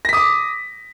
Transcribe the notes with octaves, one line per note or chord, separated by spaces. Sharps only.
D6 D#6 A#6 B6